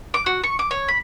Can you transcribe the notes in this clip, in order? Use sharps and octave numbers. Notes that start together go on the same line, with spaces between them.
D6
F#4
C#6
D6
C#5
B5